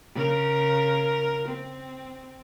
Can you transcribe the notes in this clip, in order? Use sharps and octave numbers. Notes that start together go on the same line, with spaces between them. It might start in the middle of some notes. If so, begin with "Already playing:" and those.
C#3 A#4
C4